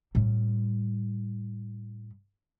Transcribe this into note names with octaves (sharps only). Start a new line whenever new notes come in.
A2 G3